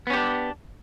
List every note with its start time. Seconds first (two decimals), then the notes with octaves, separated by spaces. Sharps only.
0.07 B3
0.10 C#4
0.13 G4
0.17 D4